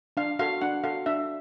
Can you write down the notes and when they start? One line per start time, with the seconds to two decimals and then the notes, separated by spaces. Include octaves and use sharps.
0.17 D4 F5
0.39 F#4 A4 F5
0.62 D4 F#5
0.84 F#4 A4 F5
1.06 D4 E5